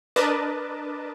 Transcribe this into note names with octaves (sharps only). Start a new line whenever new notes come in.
D4 A#4 B4 D#5 A5 D6